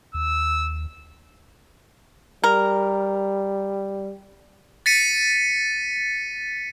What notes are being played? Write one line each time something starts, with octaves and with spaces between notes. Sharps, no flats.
D#2 E6
G3 A#4
A6 B6 C#7 D#7